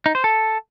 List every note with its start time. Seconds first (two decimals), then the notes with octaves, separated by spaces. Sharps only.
0.06 D#4
0.15 C5
0.24 A4